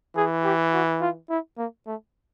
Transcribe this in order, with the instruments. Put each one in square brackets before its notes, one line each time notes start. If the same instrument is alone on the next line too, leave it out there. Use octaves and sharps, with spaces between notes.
[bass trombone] E3 [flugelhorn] G#4
[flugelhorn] G4
F#4
F4
E4
A#3
A3